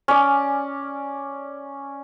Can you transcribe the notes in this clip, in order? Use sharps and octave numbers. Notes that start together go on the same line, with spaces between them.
C#4 D5